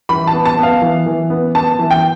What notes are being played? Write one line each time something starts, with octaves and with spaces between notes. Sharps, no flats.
E3 B5
A5
B3
A5
B3 F5
E3
E3
B3
B3 A5
E3
G5